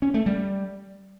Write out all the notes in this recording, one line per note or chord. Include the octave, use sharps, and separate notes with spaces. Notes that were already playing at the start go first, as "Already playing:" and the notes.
C#4
A3
G3